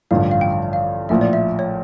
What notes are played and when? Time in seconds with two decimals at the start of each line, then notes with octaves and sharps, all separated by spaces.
0.11 A1 G2 D3 F3 F5
0.20 G5
0.31 F5
0.41 G5
0.52 F5
0.62 G5
0.73 F5
1.09 A#1 A2 F3 E5
1.21 D5
1.33 E5
1.59 C#5